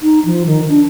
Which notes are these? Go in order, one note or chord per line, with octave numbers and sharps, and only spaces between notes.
D#4
F3
D#3
D4